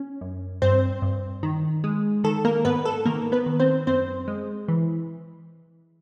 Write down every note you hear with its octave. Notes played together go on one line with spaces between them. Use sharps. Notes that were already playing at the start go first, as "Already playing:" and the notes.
Already playing: C#4
F#2
G2 C4 C5
G2
D#3
G#3
D#3 A4
A#3 A#4
G#2 B3 B4
A4
D#3 A#3 A#4
B3 B4
D#3
C4 C5
F#2 C4 C5
G#3
E3